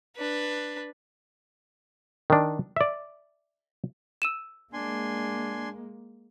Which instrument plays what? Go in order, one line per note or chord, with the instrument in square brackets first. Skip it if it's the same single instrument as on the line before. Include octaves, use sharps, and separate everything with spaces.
[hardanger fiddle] D4 B4
[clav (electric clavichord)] D#3 D4
D5 E5
[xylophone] E6 D#7 E7
[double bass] G#3 A#3 [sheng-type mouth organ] D4 G#5 C6